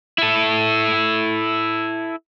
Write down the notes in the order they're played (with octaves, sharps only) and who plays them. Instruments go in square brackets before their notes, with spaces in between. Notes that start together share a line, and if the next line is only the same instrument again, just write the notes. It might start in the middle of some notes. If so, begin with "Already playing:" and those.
[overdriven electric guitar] E4 A4